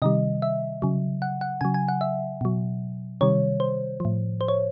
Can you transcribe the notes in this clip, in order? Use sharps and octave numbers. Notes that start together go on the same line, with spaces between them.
C3 D#3 G3 D#5
E5
C#3 F#3
F#5
F#5
C#3 F#3 G#5
G#5
F#5
E5
B2 F#3
C3 D#3 G3 C#5
C5
A2 F3
C5
C#5